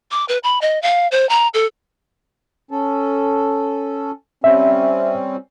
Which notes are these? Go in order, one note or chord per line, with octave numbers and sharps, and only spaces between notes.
D6
B4
B5
D#5
F5
C5
A#5
A4
C#4 A4
G3 C4 C#4 E5